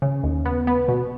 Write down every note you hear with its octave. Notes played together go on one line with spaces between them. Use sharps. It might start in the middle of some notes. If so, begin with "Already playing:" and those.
C#3
D#2
B3
B3
B2